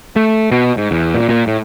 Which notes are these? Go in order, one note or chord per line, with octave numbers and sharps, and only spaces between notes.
A3
B2
G#2
E2
A#2
A#2
A2